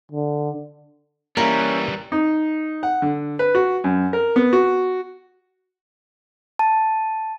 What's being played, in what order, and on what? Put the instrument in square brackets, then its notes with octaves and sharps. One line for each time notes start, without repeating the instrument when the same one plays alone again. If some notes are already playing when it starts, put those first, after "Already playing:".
[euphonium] D3
[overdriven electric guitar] E3 G3 [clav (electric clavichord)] A#3 E4 [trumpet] C#4 [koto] A#4
[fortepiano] D#4
F#5
D3
B4
F#4
F#2
A#4
B3
F#4
[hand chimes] A5